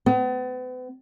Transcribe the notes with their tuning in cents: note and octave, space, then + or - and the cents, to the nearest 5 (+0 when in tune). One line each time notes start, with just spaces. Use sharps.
B3 +40